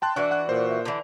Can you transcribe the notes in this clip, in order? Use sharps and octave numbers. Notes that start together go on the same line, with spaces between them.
G5 A5 C6 F#6
E3 D4 F#4 D5 F#6
F#5 F#6
A#2 C5
E5
D3 E3 D5